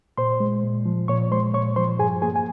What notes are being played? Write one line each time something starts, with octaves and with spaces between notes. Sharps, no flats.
A#2 C5 C6
G#3
A#2
F3
A#2 C#5 C#6
G#3 C5 C6
A#2 C#5 C#6
F3 C5 C6
G2 G#4 G#5
A#3 G#4 G#5
G#5